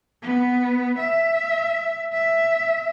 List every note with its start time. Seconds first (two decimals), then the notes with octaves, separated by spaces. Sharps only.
0.22 B3
0.99 E5
2.13 E5